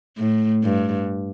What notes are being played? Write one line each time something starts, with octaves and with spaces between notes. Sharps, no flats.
A2
G2